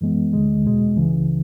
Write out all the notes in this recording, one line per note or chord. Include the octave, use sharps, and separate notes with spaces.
F#2 E3 G#3 B3
D2 D3 G#3
E2 B2 G#3
C#2 C#3 E3